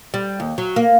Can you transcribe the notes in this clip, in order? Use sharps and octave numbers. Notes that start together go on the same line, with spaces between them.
G3
D#2
F#3
A#3